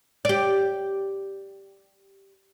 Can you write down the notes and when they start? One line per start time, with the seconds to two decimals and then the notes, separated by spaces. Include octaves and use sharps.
0.25 G4 D5